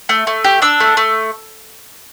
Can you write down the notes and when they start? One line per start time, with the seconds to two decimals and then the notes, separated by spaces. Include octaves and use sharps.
0.09 A3
0.27 A3
0.44 G4
0.62 D4 E6
0.80 A3
0.97 A3